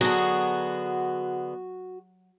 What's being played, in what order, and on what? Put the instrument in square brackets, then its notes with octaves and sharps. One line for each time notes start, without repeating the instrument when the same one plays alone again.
[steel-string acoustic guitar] D3 B3 G#4 [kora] F#3 [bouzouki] F#4